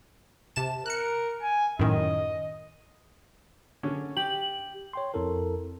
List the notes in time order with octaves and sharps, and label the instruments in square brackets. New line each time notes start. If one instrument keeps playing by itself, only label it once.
[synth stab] C3 A5 E7
[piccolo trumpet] A#4 [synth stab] F#6 C#7
[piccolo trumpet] G#5
[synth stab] F#2 A2 D#3 [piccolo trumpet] D#5
[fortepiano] D3 C#4
[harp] G4 [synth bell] F#7
[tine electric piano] C#5 G5 C6
F2 C4 E4 A4 A#4